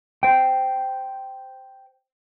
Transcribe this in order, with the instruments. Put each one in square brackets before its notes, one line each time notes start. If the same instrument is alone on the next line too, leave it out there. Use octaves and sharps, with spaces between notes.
[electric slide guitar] C5 G5